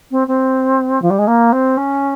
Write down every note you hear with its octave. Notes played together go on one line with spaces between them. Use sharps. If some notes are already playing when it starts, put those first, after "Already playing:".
C4
C4
F3
G3
G#3
A#3
C4
C#4